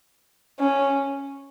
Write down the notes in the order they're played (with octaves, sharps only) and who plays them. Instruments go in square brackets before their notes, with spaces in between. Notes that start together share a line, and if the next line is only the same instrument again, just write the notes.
[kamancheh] C#4